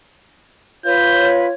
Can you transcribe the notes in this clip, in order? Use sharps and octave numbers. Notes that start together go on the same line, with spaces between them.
F4 B4 C#5 G6